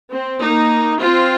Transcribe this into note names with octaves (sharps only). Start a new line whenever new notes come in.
C4
A#3 D#4
C4 F4